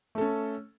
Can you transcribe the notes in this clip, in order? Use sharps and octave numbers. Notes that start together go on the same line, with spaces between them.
A3 C#4 A4